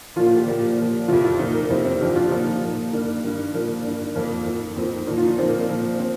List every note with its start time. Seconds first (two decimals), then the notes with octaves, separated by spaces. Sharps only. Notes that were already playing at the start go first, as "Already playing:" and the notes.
0.16 F3 F4
0.19 A#2
0.26 F4
0.37 G4
0.47 A#2 F3
0.78 A#2 F3
1.08 F2 C3 F3 F4
1.24 F4
1.39 A#2 F3 D#4
1.54 A#3
1.70 F2 C3 D#3 C4
1.85 C4
2.00 G2 F3 G4
2.15 F4
2.31 A#2 F3 D#4
2.62 A#2 F3
2.93 G2 D#3 A#3
3.24 G2 D#3
3.54 A#2 F3 A#3
3.85 G2 D#3
4.15 F2 F3 A#3
4.46 F2 D#3
4.76 F2 D#3 C4
5.07 A#2 F3 D#4
5.18 F4
5.27 D#4
5.38 A#2 F3 C4
5.48 A#3
5.58 C4
5.69 A#2 F3
5.99 C4